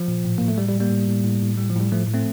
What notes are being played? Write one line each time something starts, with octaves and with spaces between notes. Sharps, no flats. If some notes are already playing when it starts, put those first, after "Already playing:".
Already playing: F3
A#2
A2
A2 A#3
A3
A2 G3
G3
A2
G3 A#3
A2
A2
A2
A2
A2 G3
F3
A2 G3
A2 F3 A3
A2
A3 C4